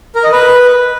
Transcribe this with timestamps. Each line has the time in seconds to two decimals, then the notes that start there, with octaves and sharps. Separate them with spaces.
0.15 A#4
0.24 D#5
0.32 B4